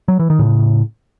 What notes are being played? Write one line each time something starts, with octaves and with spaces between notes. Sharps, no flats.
F#3
E3
D#3
A2 C#3